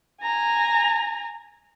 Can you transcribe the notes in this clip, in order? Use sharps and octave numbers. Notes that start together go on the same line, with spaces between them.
G#5 A#5